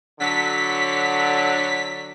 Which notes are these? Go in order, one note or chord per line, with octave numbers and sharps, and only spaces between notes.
D3 F#3 B6